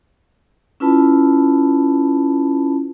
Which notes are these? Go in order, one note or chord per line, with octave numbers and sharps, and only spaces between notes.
C#4 E4 F4 B4 A5 B5